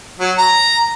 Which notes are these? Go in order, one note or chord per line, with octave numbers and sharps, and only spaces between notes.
F#3
A#5